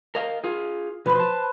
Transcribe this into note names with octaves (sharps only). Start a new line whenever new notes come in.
A#4 D#5 F5
F4 G#4
B2 F3 F#4 B4 C5
A5